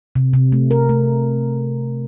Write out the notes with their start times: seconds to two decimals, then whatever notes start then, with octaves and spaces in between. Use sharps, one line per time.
0.16 C3
0.34 C3
0.52 A3
0.71 A#4
0.89 A3